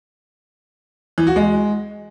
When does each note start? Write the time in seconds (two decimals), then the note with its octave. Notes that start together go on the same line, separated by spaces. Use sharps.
1.18 E3
1.27 F#4
1.36 G#3